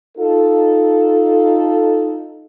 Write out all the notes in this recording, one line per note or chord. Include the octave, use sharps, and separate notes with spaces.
D#4 F4 A4